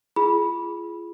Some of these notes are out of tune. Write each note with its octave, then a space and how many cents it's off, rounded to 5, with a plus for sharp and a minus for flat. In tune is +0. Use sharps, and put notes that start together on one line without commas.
F4 -30 G#4 +10 B5 -15